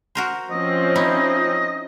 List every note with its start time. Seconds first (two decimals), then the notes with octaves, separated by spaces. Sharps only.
0.15 F#4 A#4 C5
0.51 F3 C4 C#4 D#5
0.96 D#4 E4